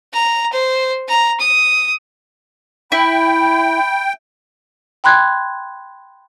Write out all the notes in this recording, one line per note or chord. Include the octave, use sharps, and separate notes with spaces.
A#5
C5
A#5
D#6
E4 G5 B5
G5 B5 C6 F#6 G#6